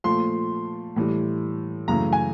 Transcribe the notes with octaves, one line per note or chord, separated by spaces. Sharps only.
A#2 F3 A3 C6
A2 E3 G3
F#2 C#3 E3 A3 A#5
G#5